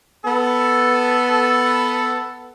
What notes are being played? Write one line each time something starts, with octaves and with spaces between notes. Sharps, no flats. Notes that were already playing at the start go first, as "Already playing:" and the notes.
B3 A4